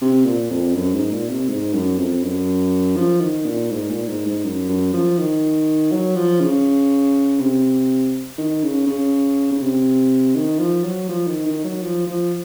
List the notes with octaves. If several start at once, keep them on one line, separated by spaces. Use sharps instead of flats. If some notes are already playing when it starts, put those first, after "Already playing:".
C3
A#2
F2
F#2
G#2
A#2
C3
G#2
F#2
F2
F#2
F3
D#3
A#2
G#2
A#2
G#2
G#2
F#2
F#2
F3
D#3
F#3
F3
C#3
C3
D#3
C#3
C#3
C#3
C3
D#3
F3
F#3
F3
D#3
D#3
F#3
F3
F3